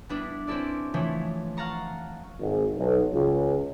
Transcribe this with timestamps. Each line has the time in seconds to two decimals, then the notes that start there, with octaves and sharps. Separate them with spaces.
0.09 G3 B3 D4 E4
0.47 C4 C#4 E4 A4 D5
0.94 E3 F3 A3 E4 C#5
1.57 F5 F#5 A5 A#5 C#6
2.40 G#1
2.77 B1
3.14 C#2